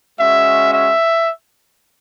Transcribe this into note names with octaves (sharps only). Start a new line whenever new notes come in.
G#3 C#4 F#4 E5
E5